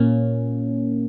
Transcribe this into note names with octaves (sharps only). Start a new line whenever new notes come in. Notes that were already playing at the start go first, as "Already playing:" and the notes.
Already playing: A#2 A#3 C#4